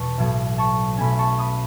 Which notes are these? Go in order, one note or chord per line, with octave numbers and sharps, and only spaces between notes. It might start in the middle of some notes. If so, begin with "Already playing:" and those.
Already playing: E2 B2 A5 C#6
B1 A2 F#3 B3
A5 C#6
B1 B2 A3 C#4 G#5 B5
A5 C#6
B5 D#6